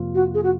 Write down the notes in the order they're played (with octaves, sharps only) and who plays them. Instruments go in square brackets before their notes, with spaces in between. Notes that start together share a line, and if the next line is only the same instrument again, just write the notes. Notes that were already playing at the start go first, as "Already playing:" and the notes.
Already playing: [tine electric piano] F2 C3 F3 A#3 F4
[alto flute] F#4
G#4
F#4